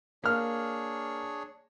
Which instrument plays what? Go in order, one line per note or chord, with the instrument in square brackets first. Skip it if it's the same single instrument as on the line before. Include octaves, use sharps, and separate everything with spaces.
[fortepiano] A#3 F6 [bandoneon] D4 G#4 C#5